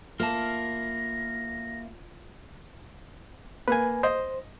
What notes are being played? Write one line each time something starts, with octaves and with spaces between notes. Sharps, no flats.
A#3 E4 F4 A5 A#6
A#3 B4 G#5
C5 D#5